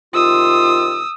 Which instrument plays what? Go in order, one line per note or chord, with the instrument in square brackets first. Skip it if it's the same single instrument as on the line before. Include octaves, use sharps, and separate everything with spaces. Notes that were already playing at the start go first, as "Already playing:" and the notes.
[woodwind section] C3 D#3 F4 [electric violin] D#6 E6